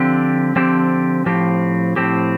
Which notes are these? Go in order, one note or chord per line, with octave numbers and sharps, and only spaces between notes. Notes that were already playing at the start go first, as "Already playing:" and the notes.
Already playing: D3 F3 C4 G4
D3 F3 C4 G4
A2 F3 C4 G4
A2 F3 C4 G4